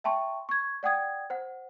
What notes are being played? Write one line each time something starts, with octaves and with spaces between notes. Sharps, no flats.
E5 G5 A5 C6 C#6
C#6 G#6
D5 F#5 G5 D#6 G#6
C5 F#5